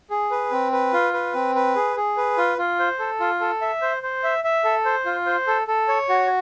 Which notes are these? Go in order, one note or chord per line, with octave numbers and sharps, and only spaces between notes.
G#4
B4
C4
B4
F4
B4
C4
B4
G#4
G#4
B4
F4
F4
C5
A4
F4
A4
E5
C5
C5
E5
E5
A4
C5
F4
C5
A4
A4
C#5
F#4